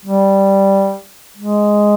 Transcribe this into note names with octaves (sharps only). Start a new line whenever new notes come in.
G3
G#3